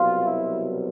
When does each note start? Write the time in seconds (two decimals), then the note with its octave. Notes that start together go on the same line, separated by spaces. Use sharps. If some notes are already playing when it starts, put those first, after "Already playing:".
Already playing: C2 B2 F#3 F4
0.24 E4